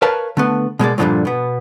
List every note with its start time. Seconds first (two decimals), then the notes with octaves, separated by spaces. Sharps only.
0.02 A#4 B4 C#5 F5 A5
0.37 D3 A3 B3
0.79 B2 G#3 A#3 D5
0.98 G2 A#2 D3 D#3 F3 F#3
1.25 B2 B3